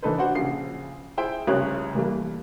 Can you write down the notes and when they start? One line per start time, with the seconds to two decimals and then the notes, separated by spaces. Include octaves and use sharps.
0.02 E3 D4 D#4 A4 B4 C5
0.18 D4 F#4 C5 F#5
0.35 A#1 C#3 C7
1.17 E4 G#4 C5 E5 G5
1.47 F1 C2 C#3 C#5 F#6
1.95 E3 G3 A3 A#3